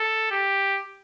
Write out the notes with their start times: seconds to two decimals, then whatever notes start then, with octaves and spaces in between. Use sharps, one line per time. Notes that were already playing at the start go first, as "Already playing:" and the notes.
Already playing: A4
0.31 G4